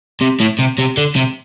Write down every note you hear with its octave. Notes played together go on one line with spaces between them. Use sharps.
C3
A2
C3
C3
D3
C3